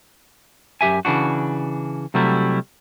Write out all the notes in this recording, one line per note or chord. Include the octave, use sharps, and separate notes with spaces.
F#2 G4 E5 G#5
C#3 E3 D4 F#4
C3 F#3 G3 A3 E4